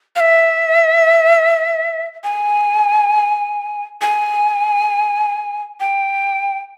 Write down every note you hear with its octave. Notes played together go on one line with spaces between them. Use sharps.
F5
E5
G#5
G#5
G5